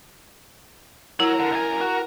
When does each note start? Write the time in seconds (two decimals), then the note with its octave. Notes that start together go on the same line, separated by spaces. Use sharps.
1.20 F#3 E4 A#4
1.39 D3
1.52 F#2 G#5
1.81 F#4